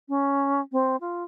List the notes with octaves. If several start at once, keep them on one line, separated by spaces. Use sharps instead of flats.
C#4
C4
F4